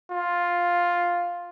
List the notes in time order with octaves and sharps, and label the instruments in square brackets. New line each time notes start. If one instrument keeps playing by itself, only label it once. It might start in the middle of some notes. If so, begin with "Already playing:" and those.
[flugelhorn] F4